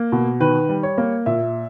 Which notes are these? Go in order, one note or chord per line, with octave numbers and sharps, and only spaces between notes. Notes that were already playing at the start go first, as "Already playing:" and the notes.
Already playing: A#3
B2
D#3 B4
G3
C#5
A#3
A#2 E5